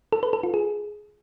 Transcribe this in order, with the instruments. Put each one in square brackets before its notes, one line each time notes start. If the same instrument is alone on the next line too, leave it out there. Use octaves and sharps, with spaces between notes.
[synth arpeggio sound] A4
B4
A4
F4
G#4